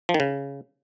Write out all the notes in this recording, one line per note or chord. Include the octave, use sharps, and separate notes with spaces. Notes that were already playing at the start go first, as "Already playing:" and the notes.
F3
D#3
C#3